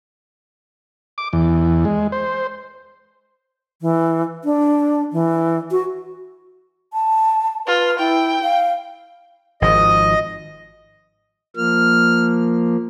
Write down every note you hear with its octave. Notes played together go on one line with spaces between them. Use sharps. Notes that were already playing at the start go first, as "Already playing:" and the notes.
D6
E2
G#3
C5
E3
D4
E3
F#4
A5
F4 B4
E4 G5
F5
G#1 F3 D#5
F3 A#3 F6